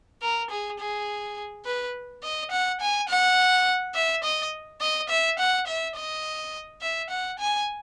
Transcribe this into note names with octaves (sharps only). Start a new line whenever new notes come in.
A#4
G#4
G#4
B4
D#5
F#5
G#5
F#5
E5
D#5
D#5
E5
F#5
E5
D#5
E5
F#5
G#5